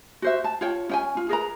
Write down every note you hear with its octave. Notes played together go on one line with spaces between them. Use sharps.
F#4 C5 E5
A5
F4 C#5 G5
C#4 G5 G#5
F4
G#4 A#4 B4 A#5